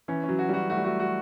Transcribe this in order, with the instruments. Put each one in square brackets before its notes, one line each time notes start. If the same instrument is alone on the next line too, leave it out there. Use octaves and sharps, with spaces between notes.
[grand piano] E3 [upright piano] C#4
[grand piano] F#3 [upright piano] C#4
[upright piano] F#4
[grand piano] G3 [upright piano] F#4
[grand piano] A3 [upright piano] F#4
[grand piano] G3
[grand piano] A3 [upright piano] F#4
[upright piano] F#4